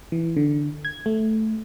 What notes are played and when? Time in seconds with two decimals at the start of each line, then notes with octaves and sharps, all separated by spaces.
0.12 E3
0.36 D3
0.85 G#6
1.06 A3